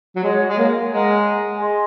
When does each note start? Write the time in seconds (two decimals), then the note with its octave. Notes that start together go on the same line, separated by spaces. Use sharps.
0.16 F#3
0.23 G#3 G#4 C#5 F#5
0.49 G#3
0.58 A#3
0.91 G#3 A#4 D#5 F#5
1.59 G#4 D#5 G#5 C6